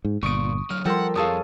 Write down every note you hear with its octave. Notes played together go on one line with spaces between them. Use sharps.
G#2
G1 A#2 C#6 D#6 D7
D3 F#3 F6
F3 G3 A4 A#4 F#5 G5 C6
F2 G#4 A4 C#5 F5 A5 D#6